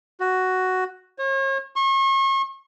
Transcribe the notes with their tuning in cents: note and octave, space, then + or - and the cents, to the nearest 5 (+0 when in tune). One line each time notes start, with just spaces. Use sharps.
F#4 +5
C#5 -40
C#6 -40